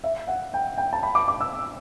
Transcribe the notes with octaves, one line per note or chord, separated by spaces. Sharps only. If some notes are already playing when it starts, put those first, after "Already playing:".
E5
F#5
G5
G5
A5
B5
D6
D6
E6